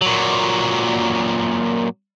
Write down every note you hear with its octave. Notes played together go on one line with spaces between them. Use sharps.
A#2 F#3